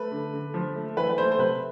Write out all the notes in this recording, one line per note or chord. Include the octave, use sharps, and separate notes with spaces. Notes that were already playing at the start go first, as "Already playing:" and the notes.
Already playing: A3 B4
D3
D3
F3
A3
E3 B4
B4
A3 C5
C5
C3 B4